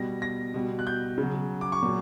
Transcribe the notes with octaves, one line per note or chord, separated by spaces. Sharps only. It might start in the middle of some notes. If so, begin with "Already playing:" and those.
Already playing: B2 G3 A#6
A#6
B2 G3
F#6
G6
C#3
F#3
D6
C#6
A#2 F#3